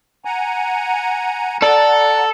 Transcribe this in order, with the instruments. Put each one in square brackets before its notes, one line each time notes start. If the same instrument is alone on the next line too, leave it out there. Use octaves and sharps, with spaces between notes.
[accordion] F#5 G#5 A#5
[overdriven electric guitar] A4 [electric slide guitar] D5 [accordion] F#5 A#5